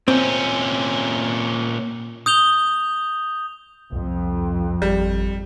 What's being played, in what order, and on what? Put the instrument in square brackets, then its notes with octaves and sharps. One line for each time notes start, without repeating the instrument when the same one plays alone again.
[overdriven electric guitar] A#2 C#4 [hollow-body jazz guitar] C4
[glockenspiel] D#6 G6 F7 G7
[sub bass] C2 [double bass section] F2
[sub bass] G#1 [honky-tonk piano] G3